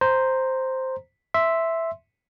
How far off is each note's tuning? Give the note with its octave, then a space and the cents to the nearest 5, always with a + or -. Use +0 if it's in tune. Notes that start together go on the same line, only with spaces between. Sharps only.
C5 +0 A#5 +0
E5 +0 C6 +0